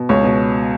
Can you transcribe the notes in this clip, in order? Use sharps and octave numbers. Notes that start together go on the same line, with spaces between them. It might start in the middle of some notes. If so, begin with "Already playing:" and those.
Already playing: B2
C#2 C#5
B2